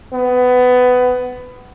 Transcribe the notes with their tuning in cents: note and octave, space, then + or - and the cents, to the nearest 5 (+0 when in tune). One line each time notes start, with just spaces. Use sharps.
B3 +20